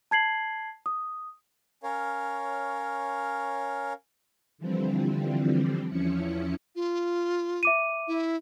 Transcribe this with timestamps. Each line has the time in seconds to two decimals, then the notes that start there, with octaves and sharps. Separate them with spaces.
0.11 A5 G#6 C7 F#7
0.86 D#6
1.83 C#4 A#4 C#5 F5
4.58 D3 E3 F3 G3 C4
5.88 E2 F3 C#4 E4 C#7
6.76 F4
7.63 E5 D6 D#7
8.08 E4